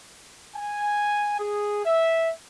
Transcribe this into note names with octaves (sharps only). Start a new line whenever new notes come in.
G#5
G#4
E5